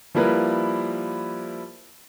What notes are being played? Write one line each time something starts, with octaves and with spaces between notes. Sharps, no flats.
F3 G3 A#3 E4 A#4 B4